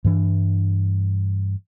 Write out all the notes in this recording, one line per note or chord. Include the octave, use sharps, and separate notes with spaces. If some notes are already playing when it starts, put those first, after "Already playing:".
G2 E3 D4